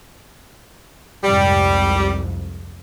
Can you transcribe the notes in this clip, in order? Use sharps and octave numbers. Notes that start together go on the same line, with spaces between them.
C2 F2 G#2 G3